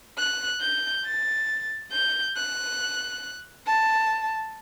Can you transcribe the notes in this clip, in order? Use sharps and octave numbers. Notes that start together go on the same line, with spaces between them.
F#6
G6
A6
G6
F#6
A5